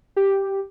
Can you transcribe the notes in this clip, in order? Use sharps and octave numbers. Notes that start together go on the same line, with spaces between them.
G4